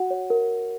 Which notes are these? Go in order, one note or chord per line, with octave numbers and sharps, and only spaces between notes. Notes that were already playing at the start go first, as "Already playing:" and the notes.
Already playing: F#4 F#5
C#5
A#4